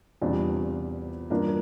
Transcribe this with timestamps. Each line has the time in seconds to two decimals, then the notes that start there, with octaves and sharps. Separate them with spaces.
0.21 E2 C3 G3 D4 F4
1.30 G2 E3 A#3 D4 F4